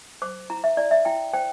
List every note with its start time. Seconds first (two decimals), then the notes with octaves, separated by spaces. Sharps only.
0.22 C5 D6
0.50 E4 A#5
0.64 E5
0.77 E4 D5
0.91 E5
1.05 E4 G5
1.34 C5 G5